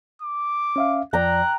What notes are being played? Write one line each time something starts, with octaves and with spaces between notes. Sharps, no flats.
D6
C#4 E5 F5
F2 F3 D5 G5 A#5 F#6